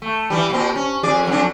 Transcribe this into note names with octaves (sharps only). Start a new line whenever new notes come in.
A3
E3 G3
A#2 C4
C#4
F2 G#4 D5
F2 F#3 D4